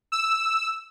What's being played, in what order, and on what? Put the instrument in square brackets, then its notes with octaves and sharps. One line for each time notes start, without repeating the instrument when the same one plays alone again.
[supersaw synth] E6